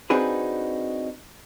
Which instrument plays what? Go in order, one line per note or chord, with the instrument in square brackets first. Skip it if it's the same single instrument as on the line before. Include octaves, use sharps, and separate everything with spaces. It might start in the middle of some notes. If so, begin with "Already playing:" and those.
[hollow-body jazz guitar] C4 D4 D#4 F#4 G#4 B4